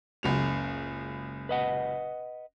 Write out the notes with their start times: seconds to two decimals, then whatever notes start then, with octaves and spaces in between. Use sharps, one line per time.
0.23 F#1 C#2 F7
1.49 B4 D#5 F#5